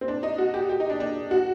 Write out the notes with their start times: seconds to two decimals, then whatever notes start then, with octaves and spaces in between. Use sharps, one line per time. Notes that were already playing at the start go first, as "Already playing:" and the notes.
0.01 C4
0.08 D4
0.23 D#4
0.38 F#4
0.54 G4
0.69 G4
0.80 D#4
0.90 D4
1.00 D4
1.31 F#4